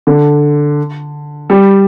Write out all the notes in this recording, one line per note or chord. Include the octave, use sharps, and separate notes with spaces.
D3
G3